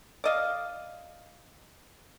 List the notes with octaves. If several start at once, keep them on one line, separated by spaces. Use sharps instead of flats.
D5 D#5 F5